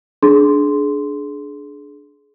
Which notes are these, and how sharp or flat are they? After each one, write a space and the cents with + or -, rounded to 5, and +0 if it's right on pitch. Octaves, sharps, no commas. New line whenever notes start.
D4 +0 G#4 +25 C6 -5